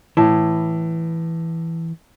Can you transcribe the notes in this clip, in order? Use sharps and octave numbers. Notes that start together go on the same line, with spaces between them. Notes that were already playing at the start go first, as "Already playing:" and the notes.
A2 E3